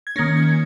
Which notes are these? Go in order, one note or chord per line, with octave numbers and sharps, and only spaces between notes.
G#6
D#3 A#3 C#4 A#6
G#6